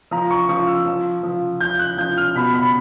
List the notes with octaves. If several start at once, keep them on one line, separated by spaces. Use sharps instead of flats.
F3 A#5
C#6
F3 C#6
E6
F3
F3
F3 G6
F#6
F3 G6
F6
B2 B5
B5